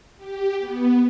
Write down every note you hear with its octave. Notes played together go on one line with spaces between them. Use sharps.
G4
B3